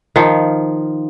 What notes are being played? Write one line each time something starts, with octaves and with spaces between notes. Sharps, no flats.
D#3 F3